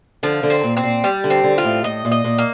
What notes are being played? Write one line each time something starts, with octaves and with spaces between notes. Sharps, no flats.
D3 F3
D3
C4
A#2
C4
A#2
G3
D3
C4
D3
F4
A2
A2 D#5
A#2
D#5
A#2
A#3